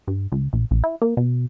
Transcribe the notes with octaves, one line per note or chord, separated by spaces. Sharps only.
G2
C#2
A#1
A#1
E4
A#3
B2